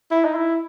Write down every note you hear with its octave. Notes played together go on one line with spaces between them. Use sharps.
E4
D#4
E4